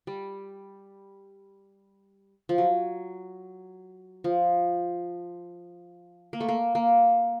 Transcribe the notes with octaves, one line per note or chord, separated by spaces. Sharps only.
G3
F3
F#3
F3
A#3
A3
A#3
A#3